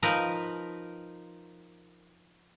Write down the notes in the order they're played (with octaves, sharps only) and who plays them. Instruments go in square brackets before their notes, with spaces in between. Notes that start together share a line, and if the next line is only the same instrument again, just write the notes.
[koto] F3 D#4 A#4 B4